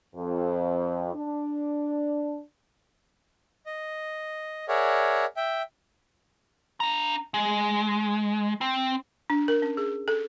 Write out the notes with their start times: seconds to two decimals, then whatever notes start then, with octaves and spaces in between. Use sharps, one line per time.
0.15 F2
1.14 D4
3.66 D#5
4.68 G#4 A#4 C#5 D5 E5 F#5
5.37 E5 G5
6.80 D4 A#5
7.34 G#3
8.61 C4
9.30 D4
9.48 A#4
9.62 C#4
9.77 G#4
10.08 A4